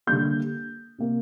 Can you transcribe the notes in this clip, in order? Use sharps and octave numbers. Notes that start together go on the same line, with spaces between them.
D3 G3 A#3 G6
C3 A#3